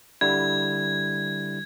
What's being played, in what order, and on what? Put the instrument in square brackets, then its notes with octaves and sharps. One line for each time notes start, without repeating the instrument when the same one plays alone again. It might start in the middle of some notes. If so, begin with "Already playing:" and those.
[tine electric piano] D3 G3 E4 [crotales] G#6